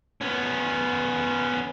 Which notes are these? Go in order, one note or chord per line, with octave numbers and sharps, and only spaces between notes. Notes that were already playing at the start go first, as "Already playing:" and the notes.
B3 C#4